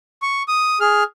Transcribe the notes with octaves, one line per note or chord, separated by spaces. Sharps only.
C#6
D#6
G#4 F6